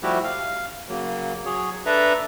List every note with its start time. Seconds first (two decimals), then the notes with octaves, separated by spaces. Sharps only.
0.03 F3 G3 A3 E4 F#4 G4
0.24 F5
0.89 C#3 F#3 A#3
1.45 F#3 G#4 C#5
1.86 D4 A4 B4 E5 A#5